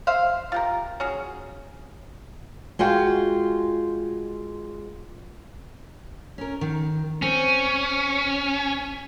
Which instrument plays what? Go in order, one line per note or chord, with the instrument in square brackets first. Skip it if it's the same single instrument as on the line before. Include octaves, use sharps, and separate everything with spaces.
[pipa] C5 E5 F5
F4 G4 A#4
C#4 F#4 G#4
[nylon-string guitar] G#3 F4 F#4 G5
[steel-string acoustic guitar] C#4 A#4
D#3
[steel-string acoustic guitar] C4 [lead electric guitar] C#4